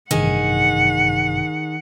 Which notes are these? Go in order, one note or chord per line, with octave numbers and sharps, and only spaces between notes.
A1 G2 C3 D#3 G#4 F#5